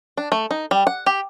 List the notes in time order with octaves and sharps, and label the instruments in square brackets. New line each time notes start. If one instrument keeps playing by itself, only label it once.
[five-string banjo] D4
A3
D#4
G3
F#5
G4